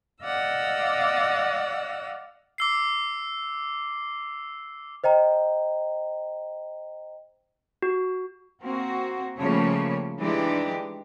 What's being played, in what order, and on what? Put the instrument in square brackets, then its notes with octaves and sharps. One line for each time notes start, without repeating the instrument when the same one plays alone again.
[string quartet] D5 D#5 F5 F#5 E6
[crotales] D6 E6 C7
[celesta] C5 D#5 G5 A#5
[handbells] F#4
[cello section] A#3 C4 F#4
C#3 F3 G3 A3 A#3 C#5
E3 G#3 D4 D#4 G4 D5